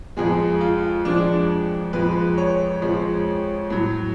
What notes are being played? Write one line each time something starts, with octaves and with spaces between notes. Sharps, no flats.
F2 F3 G#3 G#4
F4
F2 F3 G#3 D4
F2 F3 G#3 B4
C#5
F2 F3 G#3
A2 F#3